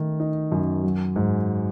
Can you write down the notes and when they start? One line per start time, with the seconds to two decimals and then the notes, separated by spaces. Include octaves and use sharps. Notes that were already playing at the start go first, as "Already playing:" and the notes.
Already playing: D#3 A3
0.20 D#4
0.52 F#2
0.83 F#3
1.16 G#2